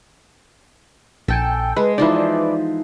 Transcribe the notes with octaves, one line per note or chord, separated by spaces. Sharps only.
A#1 A4 G5 G#5
G#3 B4
E3 F3 D#4 B4 D5